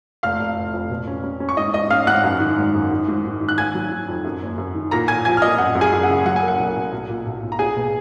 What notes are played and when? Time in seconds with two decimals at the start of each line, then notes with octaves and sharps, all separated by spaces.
0.23 F1 F5 F6
0.39 F1
0.56 F1
0.74 F2
0.90 B2
1.07 C#4
1.24 C#4
1.40 C#4
1.49 C#6
1.57 G#2 D#5 D#6
1.74 G#2 D#5 D#6
1.90 C#4 F5 F6
2.07 G#2 F#5 F#6
2.24 F#2
2.40 D#3
2.58 G#1
2.75 F#2
2.91 D#3
3.08 G#2
3.24 D#3
3.41 D#3
3.49 F#6
3.58 D#3 G#5 G#6
3.75 F#3
3.92 D#3
4.08 F2
4.24 F#2
4.42 F#1
4.58 F#2
4.75 D#3
4.91 A#2 A#5 A#6
5.08 A#2 G#5 G#6
5.25 F3 G#5 G#6
5.37 F6
5.42 A#2 D#5 D#6
5.58 F#2 F#5
5.75 F#2
5.81 G#4 G#5
5.92 F#2
6.03 F#5
6.09 C#3
6.26 F#3 F#5
6.36 G#5
6.42 A#3
6.48 F#5
6.59 B1
6.76 B1
6.93 B1
7.09 A#2
7.26 B1
7.43 B1
7.52 A#5
7.59 B1 G#4 G#5
7.77 B2